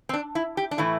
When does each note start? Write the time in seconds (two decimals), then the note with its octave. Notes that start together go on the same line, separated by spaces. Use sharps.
0.09 C4
0.14 D4
0.35 E4
0.57 G4
0.71 D4
0.78 A2 E3 A3 E4